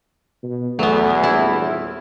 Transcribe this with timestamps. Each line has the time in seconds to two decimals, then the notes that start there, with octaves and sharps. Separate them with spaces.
0.43 B2
0.79 E2 F#3 A3 B3
1.23 D#1 E4